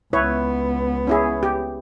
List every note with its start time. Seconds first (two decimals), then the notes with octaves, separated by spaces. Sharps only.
0.13 C#2 B3 E4 B4 C#5
1.07 C#4 E4 G#4
1.43 G4